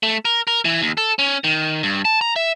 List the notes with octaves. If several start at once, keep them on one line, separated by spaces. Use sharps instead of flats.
A3
A#4
A#4
E3
D#2
A4
C#4
D#3
G2
A5
A#5
E5